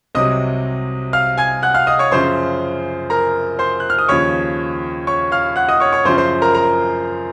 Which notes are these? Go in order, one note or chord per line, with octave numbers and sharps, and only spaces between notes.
C2 C3 F#3 D#5 D#6
F5 F6
G#5 G#6
F#5 F#6
F5 F6
D#5 D#6
C#5 C#6
F#2 C#3 F3 C5 C6
A#4 A#5
C5 C6
F#6
F6
D#6
D#2 C#3 F3 C#5 C#6
C#5 C#6
F5 F6
F#5 F#6
D#5 D#6
C#5 C#6
C#5 C#6
F#2 C#3 F3 C5 C6
C5 C6
A#4 A#5
A#4 A#5